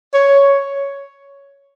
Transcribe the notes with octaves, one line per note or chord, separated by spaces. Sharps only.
C#5